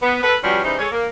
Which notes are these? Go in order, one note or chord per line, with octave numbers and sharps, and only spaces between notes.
B3
A4 B4
F3 G3 B3 C#4 F#4 G4
C#3 E3 G3 D#4 C5 D#5
G#3 G#4 A4 C#5
A#3